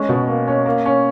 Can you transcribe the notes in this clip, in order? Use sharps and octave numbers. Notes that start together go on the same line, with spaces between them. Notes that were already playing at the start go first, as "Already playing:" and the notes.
Already playing: G#3 C#4
B2
A#3
C#4
A#3
C#4